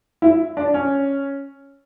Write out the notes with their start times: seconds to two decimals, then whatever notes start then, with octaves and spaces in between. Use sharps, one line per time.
0.22 E4
0.57 D4
0.74 C#4